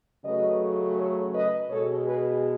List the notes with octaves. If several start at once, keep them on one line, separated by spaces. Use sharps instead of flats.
C#3 F#3 A3 B4 D#5
A4 C#5
B4 D#5
B2 G#3 A4 C#5
G#4 B4